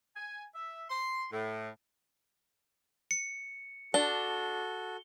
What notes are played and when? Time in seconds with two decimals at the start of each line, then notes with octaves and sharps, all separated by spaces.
0.16 G#5
0.55 E5
0.90 C6
1.32 A2
3.11 C#7
3.94 D4 F#4 A4 G7